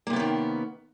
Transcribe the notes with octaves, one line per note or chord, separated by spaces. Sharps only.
C3 D#3 A#3 B3 C#4